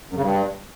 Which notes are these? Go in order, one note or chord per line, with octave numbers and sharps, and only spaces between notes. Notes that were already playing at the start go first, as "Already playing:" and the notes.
F#2
C#3
G2